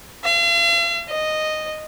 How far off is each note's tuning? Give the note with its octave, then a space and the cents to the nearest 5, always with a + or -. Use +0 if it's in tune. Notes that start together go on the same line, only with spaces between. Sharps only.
F5 -45
D#5 -10